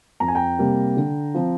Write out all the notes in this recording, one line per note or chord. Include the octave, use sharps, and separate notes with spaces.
F2 A#5
G#5
G5 A#5
C3 G3 A#3
D3
F3 C4